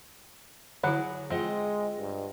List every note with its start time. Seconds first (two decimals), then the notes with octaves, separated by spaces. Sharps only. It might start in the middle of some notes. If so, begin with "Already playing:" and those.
0.83 D3 F#3 E4 G#4 F#5
1.30 G#3 C4 F4 D#5 F#5
1.99 G2